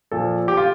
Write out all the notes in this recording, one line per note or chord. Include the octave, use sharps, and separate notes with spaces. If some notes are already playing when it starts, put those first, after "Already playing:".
A#2 F3 A4
G4
F4